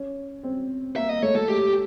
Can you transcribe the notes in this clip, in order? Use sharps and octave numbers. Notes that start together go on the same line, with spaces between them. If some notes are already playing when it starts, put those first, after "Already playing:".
Already playing: C#4
C4
A#3 E5
A#3 D#5
A3 C#5
A3 A4
G#3 G4